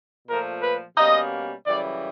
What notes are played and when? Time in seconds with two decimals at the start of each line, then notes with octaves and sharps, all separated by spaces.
0.28 A#2 F3 A3 A#4
0.62 B4
0.96 B2 G3 A#3 C#4 D#5
1.66 F#2 C#3 E3 G3 D5